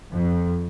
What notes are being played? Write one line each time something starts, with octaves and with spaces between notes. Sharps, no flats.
F2